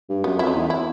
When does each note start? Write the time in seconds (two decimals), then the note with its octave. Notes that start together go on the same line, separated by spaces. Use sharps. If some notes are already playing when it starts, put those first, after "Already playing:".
0.09 G2
0.24 F#2 B3
0.39 F2 E4
0.47 D#4
0.56 E2
0.70 E4